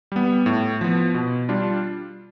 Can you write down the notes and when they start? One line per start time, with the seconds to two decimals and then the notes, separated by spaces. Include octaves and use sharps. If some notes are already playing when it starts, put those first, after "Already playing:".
0.12 G3 B3
0.46 A2
0.81 F3 B3
1.14 B2
1.49 G3 D4 F4